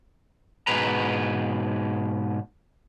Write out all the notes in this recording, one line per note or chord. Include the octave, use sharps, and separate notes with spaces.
G#2 B2 G#4 B4 A#5